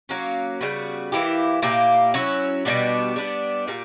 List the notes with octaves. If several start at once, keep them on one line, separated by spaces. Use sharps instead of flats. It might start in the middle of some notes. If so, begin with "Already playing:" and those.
F#3 A#3 C#4
C#3 G3 B3 F#4
E3 A#3 E4 G4
A#2 A#3 E4 G4
F#3 C#4 E4
B2 G3 B3 D4
G3 B3 D4
A#2 G3